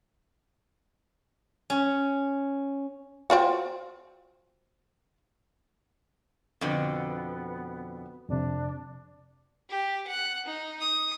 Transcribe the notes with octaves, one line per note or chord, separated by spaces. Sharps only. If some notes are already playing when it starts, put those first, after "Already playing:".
C#4
C4 F4 F#4
F2 B2 D3 B3
F2 C3 D4
G4
F#5 F#6
D#4
D#6